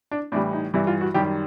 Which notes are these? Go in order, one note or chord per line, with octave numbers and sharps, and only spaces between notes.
D4
A2 E3 G3 D4
D#4
G2 E3 G3 E4
F4
F#4
F#2 D#3 G3 G4